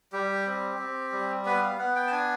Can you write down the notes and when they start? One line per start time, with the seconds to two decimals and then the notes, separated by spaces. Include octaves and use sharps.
0.13 G3 G4
0.47 C4
0.79 C4
1.12 G3
1.45 B3 B4
1.62 F5
1.78 B3 F#5
1.96 G5
2.07 A5
2.12 D4 G#5